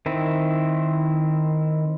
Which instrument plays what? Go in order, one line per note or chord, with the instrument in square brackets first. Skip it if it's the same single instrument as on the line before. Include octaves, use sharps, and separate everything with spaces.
[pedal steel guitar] D#3 C4 E4